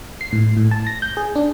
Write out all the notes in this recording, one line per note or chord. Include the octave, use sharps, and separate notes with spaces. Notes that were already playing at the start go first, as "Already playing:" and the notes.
C7
A2
A2
A5
A#6
G6
G#4
D4